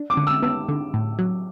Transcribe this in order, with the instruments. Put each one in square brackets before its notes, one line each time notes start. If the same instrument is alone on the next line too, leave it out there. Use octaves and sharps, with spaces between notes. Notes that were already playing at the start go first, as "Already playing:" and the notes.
Already playing: [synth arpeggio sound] D4
[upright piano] D6
[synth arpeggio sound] D3
[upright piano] E6
[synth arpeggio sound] B3 [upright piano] E6
[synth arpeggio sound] D3
A2
F#3